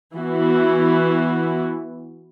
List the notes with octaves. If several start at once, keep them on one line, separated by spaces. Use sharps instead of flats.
E3 B3 F#4